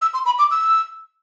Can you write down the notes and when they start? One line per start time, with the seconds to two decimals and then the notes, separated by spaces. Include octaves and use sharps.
0.02 E6
0.14 C6
0.26 B5
0.39 D6
0.51 E6